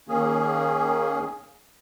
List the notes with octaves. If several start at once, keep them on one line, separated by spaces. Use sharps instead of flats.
D#3 A#3 C#4 G#4